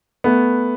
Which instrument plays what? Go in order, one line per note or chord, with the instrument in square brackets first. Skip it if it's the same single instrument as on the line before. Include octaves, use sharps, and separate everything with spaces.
[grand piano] A3 B3